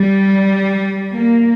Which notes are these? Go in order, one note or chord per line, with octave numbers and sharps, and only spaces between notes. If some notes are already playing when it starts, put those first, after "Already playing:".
Already playing: G3
A#3